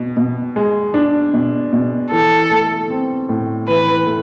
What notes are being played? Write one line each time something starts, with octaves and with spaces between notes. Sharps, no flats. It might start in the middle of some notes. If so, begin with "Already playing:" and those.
Already playing: B2
B2
G#3
D4
B2
B2
E3 A4
A3
C4
A2
E3 B4
A3